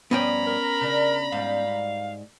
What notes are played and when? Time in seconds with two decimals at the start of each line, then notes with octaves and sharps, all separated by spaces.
0.11 G2 F3 B3 C#4 G5 A#5 B5
0.47 A#4
0.81 C#3 D4
1.32 G#2 G3 F5